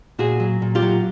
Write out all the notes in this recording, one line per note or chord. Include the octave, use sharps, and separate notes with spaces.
A#2 F#4 G#4
F#3
A#2
F4 G4
F#3